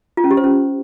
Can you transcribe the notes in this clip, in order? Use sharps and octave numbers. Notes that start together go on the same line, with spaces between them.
F4
C#4
G4
C5
C#4